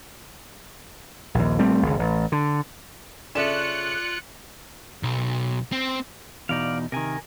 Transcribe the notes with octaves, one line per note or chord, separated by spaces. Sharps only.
A#1 D#2
A#1 G3 A3 C4
G#1 C#2
A1
D3
C#3 F4 A4 D5 E5 F#6 C#7 E7
B1
C4
E2 B2 D#4 D5 F5
C3 D#3 A#4 G#5